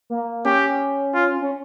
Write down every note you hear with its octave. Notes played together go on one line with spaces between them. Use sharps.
A#3
C#4 G4
F4
C#4